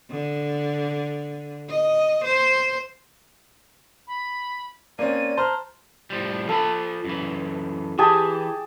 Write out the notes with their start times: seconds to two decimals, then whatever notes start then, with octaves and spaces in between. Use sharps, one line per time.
0.11 D3
1.69 D#5
2.24 C5
4.07 B5
4.99 A#3 C4 C#4 D5 D#7
5.37 C5 A5 A#5 F6
6.10 A2 F3 G3
6.49 F3 F4 A4 B5
7.05 F#2 E3
7.98 E3 G4 G#4 A5